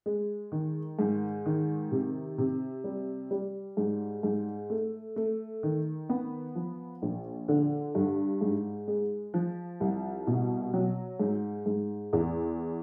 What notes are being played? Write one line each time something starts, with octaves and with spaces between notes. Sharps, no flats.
G#3
D#3
G#2
D#3
C3
C3
G3
G3
G#2
G#2
A3
A3
D#3
B3
F3
A#1
D3
G2
G#2
G#3
F3
C2
B2
F#3
G#2
G#2
E2